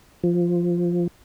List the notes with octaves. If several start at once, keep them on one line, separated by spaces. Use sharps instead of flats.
F3